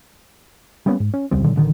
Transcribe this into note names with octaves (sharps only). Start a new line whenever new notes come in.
G3 A#3 B3 C#4
G#2
C#4
E1 C#2 G3 C4
A#2 D3 D#3 F#3
A1 D3 D#3